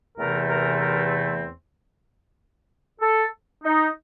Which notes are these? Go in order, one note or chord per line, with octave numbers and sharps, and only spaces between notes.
E2 C3 E3 A3 C4 A#4
A#4
A#4
A4
D#4